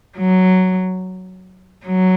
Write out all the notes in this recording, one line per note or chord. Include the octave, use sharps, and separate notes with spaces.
F#3
F#3